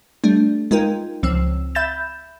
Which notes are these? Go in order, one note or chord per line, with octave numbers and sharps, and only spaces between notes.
G3 A3 D4
G#3 D#4 F4 A#4 G5
C#2 F3 C4 E6
E5 B5 G6 A6 E7